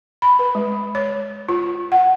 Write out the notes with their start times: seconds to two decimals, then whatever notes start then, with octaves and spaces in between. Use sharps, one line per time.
0.22 B5
0.39 B4
0.55 G#3
0.95 C#5
1.49 F4
1.92 F#5